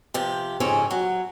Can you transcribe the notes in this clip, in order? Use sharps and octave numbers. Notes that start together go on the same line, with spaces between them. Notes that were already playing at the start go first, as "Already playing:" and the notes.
C3 F3 G4
F2 G#2 C#3 C4 C#4
F#3